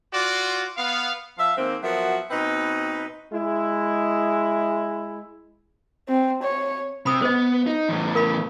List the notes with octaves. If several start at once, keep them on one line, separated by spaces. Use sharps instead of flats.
F4 F#4 D5 C6
B3 F5
F3 E5 F5
D#3 G#3 A#3 C4
F3 F#3 B3 F#4 A#4 E5
B2 C4 D#4 B4
G#3 E4
C4
C#5
C3 B5 D#6
B3 C5 D#5
D#4
E2 A2
A#4 F5 B5